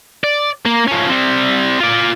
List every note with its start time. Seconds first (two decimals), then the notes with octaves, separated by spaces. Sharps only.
0.24 D5
0.66 A#3
0.88 F3 C#4
1.09 G3 C4
1.80 F4 D5